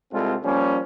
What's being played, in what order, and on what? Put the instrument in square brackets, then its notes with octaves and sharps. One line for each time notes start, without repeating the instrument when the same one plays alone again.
[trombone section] C2 G3 G#3 C4 F4 A4
F3 G3 A#3 C#4